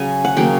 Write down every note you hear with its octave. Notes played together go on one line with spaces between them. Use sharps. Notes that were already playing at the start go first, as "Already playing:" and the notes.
Already playing: C#3 F#3 G#5
F#5
C#3 F#3 A#3 G5